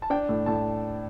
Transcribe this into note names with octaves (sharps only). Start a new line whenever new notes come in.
A5
D4 G5
A2
A2 A5